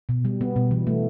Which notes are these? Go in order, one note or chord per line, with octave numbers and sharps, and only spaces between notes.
B2
G3
B3
B2
E3
A3